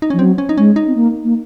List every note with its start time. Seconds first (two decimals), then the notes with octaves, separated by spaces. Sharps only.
0.02 D#4
0.10 F3 C#4
0.19 F#3 C4
0.38 C#4
0.49 D#4
0.58 G#3 C#4
0.76 D#4
0.87 C4
0.95 A#3
1.24 A#3